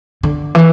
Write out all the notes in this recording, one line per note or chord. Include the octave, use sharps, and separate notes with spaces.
D3
E3